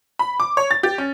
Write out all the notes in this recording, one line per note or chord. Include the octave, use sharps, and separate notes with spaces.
B5
D6
C#5
A6
G4
C#4